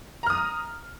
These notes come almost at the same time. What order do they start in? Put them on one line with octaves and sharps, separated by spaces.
A#5 F6 D#6